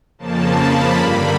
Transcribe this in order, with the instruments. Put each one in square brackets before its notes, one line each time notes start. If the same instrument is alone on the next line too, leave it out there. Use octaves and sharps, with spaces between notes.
[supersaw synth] F2 C#3 F3 A#3 A5
B5
G2 D3 G3 A#3